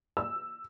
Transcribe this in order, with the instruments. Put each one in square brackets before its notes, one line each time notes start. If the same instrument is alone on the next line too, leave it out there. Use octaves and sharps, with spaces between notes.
[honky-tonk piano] E6